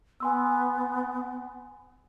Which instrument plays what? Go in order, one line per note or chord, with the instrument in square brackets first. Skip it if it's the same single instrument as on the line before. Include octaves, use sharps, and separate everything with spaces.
[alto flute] B3 [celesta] G#5 C6 E6